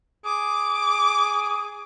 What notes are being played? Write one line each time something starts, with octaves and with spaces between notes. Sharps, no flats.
G#4 D6